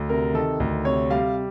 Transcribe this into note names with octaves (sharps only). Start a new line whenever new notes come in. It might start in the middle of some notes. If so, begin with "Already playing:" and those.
Already playing: D2
C3 A#4
D#3 A4
D2
C3 C#5
G3 F5